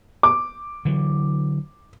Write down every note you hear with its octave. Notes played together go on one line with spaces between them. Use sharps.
D6
D3 E3 F#3